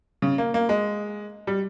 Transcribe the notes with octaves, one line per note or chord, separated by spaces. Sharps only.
C#3
A#3
A#3
G#3
G3